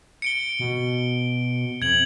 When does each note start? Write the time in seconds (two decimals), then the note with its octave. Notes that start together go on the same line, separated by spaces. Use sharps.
0.22 C#7 D7 G7
0.60 B2
1.82 F2 G#6 F#7